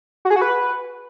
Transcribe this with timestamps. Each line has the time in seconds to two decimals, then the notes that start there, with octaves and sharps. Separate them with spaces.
0.25 F#4
0.30 G#4
0.36 F#4
0.41 B4